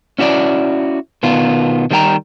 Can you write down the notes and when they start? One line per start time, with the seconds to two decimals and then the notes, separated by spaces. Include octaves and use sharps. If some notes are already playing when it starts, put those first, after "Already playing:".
0.19 C#4 E4 F#4 C#5 D5
1.23 B2 D#3 B3 F4
1.91 D#3 G3 A#3 D4 G5 A#5